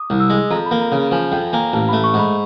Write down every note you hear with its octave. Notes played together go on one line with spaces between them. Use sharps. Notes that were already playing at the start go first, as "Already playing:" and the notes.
Already playing: D6 D#6
C2
E6
G#3
F2 A#5
B5
A#3
A#5
C#3
F3 G#5
F2 G5
A#3 G#5
A1 A5
A3 B5
C#6
G#2 B5